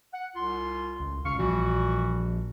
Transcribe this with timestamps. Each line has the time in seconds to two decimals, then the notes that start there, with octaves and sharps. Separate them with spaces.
0.13 F#5
0.35 C2 F4 C6
1.00 C#2
1.25 C2 C#3 F5 C#6
1.39 A#1 E3 F3 G3 F#4